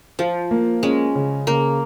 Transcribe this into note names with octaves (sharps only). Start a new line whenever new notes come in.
F3 F4
A#3
G#3 C#4
C#3
C#3 A#3